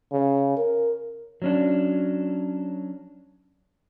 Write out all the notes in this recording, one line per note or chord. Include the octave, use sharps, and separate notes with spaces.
C#3
A#4
F#3 C#4 D4